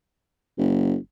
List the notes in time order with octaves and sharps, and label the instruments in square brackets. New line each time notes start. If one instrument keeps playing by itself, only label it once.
[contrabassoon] F#1